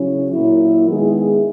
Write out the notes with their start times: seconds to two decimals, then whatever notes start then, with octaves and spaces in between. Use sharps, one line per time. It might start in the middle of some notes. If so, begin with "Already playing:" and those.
Already playing: C#3 F#3 C#4 E4
0.31 A#2 F#3 A#3 E4
0.89 D#3 G#3 B3 E4 G#4